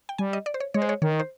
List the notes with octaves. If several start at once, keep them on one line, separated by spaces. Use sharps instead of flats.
G5
G3 G#5
D#5
D5
C5
C#5
G#3 C#5
C5
C#5
D#3 C#5
C5